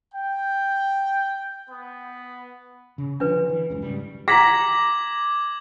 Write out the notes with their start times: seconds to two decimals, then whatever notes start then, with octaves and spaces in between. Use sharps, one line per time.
0.14 G5
1.69 B3
2.98 C#3
3.20 D3 F3 C#4 D4 B4
3.49 E3
3.70 F#1 C#2 C#3
3.82 G#2 C#3 G3
4.28 G5 A#5 D6 G#6 A#6 B6 F#7